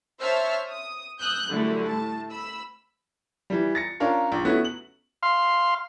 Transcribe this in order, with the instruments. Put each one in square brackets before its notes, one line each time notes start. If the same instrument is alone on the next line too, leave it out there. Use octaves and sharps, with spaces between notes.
[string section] C5 C#5 E5 A5 E6 F6
D#6
D#6 E6 F#6 G6
F#2 D3 G3 A3 E4
A2 A5
B5 E6
[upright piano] E3 G3
A6 A#6 C#7
C#4 D4 F4 A#4 C#5
A#1
A3 B3 C#4 E4 F#4
F#7
[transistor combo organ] F5 C6